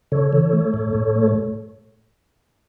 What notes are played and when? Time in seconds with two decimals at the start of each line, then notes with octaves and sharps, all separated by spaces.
0.12 C#3 A4 C#5
0.33 E3
0.53 A3
0.74 A2
0.94 A2
1.16 A3